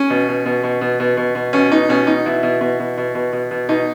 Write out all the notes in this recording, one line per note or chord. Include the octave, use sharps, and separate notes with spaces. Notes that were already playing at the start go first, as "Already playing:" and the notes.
Already playing: C#4
B2
B2
B2
B2
B2
B2
B2
B2
B2 C#4
B2 D#4
B2 C#4
B2 D#4
B2 E4
B2
B2
B2
B2
B2
B2
B2
B2 D#4